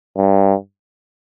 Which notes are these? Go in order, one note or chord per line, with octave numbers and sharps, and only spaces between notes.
G2